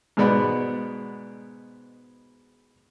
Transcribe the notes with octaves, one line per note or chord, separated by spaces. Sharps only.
G#2 B2 G#3 B3 D5 B5